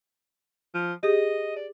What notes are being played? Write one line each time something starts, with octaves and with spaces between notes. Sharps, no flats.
F3
G4 G#4 D#5 D#6
D5